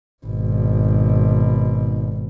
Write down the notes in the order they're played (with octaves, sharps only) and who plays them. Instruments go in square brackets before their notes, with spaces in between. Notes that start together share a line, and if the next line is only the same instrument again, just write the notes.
[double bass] G#1 B2